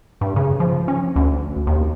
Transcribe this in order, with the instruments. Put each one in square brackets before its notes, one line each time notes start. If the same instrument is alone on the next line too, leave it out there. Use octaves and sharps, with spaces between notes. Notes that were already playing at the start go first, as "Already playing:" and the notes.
[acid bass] G2
C#3
F3
C#4
D2
D#2